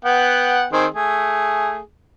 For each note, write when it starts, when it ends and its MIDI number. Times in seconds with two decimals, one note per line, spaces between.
0.05 0.65 59
0.05 0.65 78
0.05 0.65 79
0.73 0.86 51
0.73 0.86 60
0.73 0.86 68
0.94 1.79 57
0.94 1.79 68